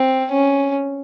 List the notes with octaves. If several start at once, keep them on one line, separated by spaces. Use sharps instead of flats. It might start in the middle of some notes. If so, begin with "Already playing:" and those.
Already playing: C4
C#4